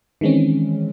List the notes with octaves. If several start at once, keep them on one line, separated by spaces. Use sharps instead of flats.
D#3 E3 G#3 C4 C#4